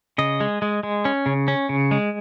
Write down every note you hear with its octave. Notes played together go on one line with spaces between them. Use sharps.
C#3 D#5
G#3
G#3
G#3
C#4
C#3
C#4
C#3
G#3